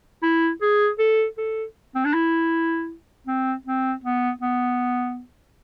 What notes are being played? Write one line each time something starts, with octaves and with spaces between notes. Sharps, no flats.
E4
G#4
A4
A4
C4
D4
E4
C4
C4
B3
B3